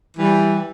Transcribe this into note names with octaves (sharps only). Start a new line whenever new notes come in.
E3 G3